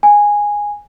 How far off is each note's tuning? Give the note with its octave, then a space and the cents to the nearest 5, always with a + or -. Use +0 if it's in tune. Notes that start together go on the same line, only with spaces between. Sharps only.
G#5 -10